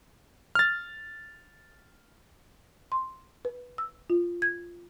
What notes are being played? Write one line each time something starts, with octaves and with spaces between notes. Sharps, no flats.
F6 A6
C6
B4
E6
F4
G#6